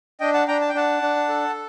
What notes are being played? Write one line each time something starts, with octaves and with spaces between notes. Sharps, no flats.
D4 D#5 G5
F#5 A5
D4 G5 A#5
A5
G5
D4 F#5 A5
D4
A4